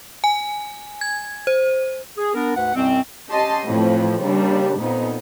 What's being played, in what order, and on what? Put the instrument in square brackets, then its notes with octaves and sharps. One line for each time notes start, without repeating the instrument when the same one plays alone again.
[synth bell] G#5
G#6
C5
[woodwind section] G#4
B3 D4 A#4
D2 G#2 B4 F#5
C2 F#2 B2 C4
[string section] C#4 G4 D#5 A5 C6
F2 A2 E3 F3
D#2 C#3 G3 D4
F2 A#2 B3 D#4